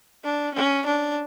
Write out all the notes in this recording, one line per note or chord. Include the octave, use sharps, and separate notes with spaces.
D4
C#4
D4